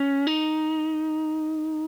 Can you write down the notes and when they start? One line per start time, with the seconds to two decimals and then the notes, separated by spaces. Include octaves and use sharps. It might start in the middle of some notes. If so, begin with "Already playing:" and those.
Already playing: C#4
0.27 D#4